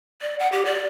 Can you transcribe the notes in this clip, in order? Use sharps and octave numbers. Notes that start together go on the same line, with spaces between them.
D5
F#5
G4
D5